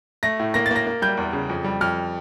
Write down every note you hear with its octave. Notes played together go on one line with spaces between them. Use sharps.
A3 A#6
A2
A#3 A#6
A6
A#3 A#6
A#3
G3 G6
E2
C#3
F2
G3
F2 F6